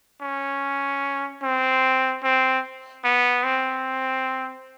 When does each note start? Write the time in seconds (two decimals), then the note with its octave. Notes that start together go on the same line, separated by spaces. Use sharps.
0.22 C#4
1.43 C4
2.24 C4
3.04 B3
3.44 C4